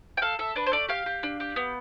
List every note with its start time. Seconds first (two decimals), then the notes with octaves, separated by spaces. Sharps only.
0.17 G5
0.22 A4 F5
0.39 A4 E5
0.56 D4 B4
0.66 C5
0.72 A3 D5
0.89 G4 F5
1.06 G4
1.23 D4
1.40 G4
1.56 B3